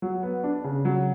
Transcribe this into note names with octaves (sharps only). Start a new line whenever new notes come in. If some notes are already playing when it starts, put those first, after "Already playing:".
F#3
B3
D4
C#3
F#3